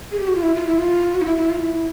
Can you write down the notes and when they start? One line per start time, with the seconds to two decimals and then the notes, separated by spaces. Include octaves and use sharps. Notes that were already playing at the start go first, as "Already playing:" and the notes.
0.12 G#4
0.20 G4
0.28 F#4
0.35 F4
0.43 E4
0.55 F4
0.67 E4
0.79 F4
1.14 F#4
1.21 D#4
1.26 E4
1.37 E4
1.50 F4
1.62 E4
1.74 E4